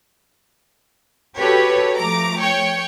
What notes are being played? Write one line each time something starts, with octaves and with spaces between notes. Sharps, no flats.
F#4 G4 A4 B4 C#5
F3 A3 A#5 D6
C#5 G5 C#6